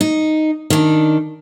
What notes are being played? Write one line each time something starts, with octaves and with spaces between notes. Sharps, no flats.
D#4
D#3 D4